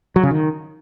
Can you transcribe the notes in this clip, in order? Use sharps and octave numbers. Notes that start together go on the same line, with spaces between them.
F#3
C#3
D#3